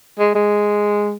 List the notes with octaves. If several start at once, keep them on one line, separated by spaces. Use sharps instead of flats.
G#3
G#3